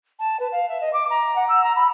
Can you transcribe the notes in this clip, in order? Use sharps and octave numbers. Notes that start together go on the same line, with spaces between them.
A5
B4
F5
E5
D#5
D6
A#5
F#5
E6
A#5
B5